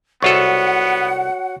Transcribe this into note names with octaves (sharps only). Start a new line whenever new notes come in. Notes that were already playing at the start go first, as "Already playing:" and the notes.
C2 B3 F4 F#4 A4 C#5 F#5 C#6